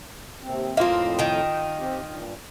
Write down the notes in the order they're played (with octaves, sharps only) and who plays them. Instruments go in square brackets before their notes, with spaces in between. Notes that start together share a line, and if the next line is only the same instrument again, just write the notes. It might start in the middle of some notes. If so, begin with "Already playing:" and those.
[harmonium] D#2 C3 C4
[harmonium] F2 A2 D#5 [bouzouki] A#3 C4 [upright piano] F4 F5
[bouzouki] D#3 G5
[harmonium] C4 G4
G2 A#2